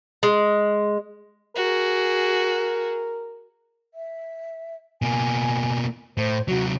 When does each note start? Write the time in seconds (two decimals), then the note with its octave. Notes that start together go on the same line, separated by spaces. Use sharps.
0.23 G#3
1.56 F#4 G#4 A#4
3.94 E5
5.02 B2 A#3 G#5
6.17 A2 C5
6.48 C3 F#3 F#4